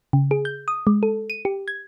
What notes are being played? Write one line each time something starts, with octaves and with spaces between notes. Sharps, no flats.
C#3
G#4
G6
D#6
G#3
A4
D#7
G4
G#6